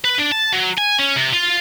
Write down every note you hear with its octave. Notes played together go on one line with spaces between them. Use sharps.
B4
D4
A5
F#3
G#5
C#4
C3
F4